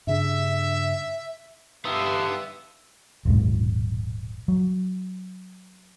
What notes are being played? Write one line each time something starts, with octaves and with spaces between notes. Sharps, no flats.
G2 C#3 D4 E5
G2 D3 B3 D#4 G4 E5 F5
D#1 B1 G#2
F#3